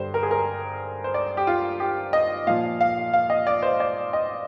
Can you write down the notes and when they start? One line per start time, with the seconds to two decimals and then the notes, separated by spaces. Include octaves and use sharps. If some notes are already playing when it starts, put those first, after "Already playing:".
Already playing: G2 D3 G3 C5
0.14 A#4
0.23 G#4
0.31 A#4
1.04 C5
1.14 D5
1.37 G4
1.47 F4
1.80 G4
2.13 D#5
2.47 A#2 F3 F5
2.81 F5
3.13 F5
3.30 D#5
3.47 D5
3.62 C5
3.80 D5
4.13 D#5